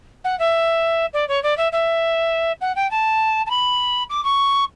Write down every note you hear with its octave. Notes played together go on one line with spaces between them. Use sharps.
F#5
E5
D5
C#5
D5
E5
E5
F#5
G5
A5
A5
B5
D6
C#6